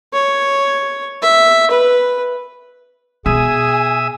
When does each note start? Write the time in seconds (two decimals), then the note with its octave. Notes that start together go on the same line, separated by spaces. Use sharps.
0.13 C#5
1.22 E5
1.70 B4
3.26 B2 G#4 E5 G#5 D#6